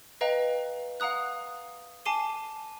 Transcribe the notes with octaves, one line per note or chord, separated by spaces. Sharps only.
B4 D#5 F5 G5 A#5
F5 F#5 A#5 D#6 F#6
G#5 A5 D6 C7 D#7 G7